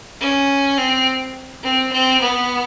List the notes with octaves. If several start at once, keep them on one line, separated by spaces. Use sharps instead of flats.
C#4
C4
C4
C4
B3